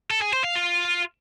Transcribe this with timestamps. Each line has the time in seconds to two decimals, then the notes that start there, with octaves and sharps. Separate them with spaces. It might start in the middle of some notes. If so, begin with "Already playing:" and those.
0.11 A4
0.22 G#4
0.33 C5
0.44 F5
0.56 F4